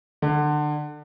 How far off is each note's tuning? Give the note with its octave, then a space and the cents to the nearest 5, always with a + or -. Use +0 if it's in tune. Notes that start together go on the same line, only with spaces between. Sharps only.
D3 +25